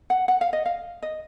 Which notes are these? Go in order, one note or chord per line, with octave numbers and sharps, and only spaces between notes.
F#5
F#5
F5
D#5
F5
D#5